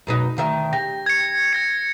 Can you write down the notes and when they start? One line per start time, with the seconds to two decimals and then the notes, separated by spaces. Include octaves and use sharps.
0.07 F#2 B2 D#4
0.37 D2 D#3 E5
0.73 G4 A#6
1.06 G#6 C#7
1.53 G#6 A#6 C#7